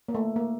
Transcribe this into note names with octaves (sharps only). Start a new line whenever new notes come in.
A#3
A3
A#3